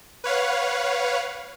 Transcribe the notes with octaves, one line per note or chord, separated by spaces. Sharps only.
B4 C#5 F5 F#5